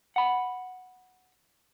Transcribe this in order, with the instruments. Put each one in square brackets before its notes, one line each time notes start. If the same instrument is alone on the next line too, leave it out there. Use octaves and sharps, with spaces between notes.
[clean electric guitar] F#5 B5